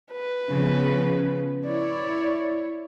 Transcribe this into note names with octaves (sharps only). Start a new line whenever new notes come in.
B4
C#3 F3 B3
E4 C#5 D5